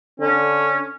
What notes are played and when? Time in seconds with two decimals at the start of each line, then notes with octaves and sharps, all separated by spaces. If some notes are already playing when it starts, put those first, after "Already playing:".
0.20 D3 C#4